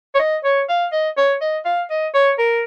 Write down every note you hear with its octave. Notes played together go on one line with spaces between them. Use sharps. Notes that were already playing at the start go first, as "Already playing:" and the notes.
C#5
D#5
C#5
F5
D#5
C#5
D#5
F5
D#5
C#5
A#4